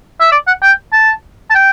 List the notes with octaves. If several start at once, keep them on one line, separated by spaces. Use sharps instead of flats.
E5
D5
F#5
G5
A5
A5
G5